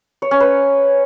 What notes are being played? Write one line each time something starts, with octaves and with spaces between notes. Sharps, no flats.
C#5
C#4
B4